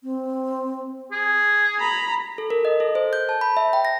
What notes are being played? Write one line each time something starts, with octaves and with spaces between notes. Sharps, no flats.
C4
G#4
A#5 B5
A4
A#4
D#5
A4
C5
G6
A5
B5
E5
G5
A#6